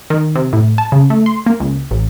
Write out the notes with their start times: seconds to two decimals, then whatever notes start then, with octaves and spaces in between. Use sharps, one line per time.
0.10 D#3
0.35 C3
0.53 A2
0.78 A5
0.92 C#3
1.10 A3
1.26 C6
1.46 A#3
1.60 C#2
1.91 A1